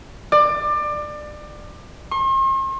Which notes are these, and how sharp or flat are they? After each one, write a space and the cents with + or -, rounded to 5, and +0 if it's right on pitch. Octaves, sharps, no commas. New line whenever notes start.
D5 +25
C6 +45